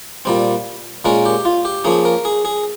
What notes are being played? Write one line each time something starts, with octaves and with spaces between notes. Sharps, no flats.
A#2 G3 C4
A#2 G#3 C#4 A#4
G4
F4
G4
F3 A#3 C#4 G#4
A#4
G#4
G#4